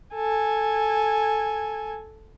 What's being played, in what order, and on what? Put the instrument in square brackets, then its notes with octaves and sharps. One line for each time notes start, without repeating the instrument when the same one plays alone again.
[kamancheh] A4 G#5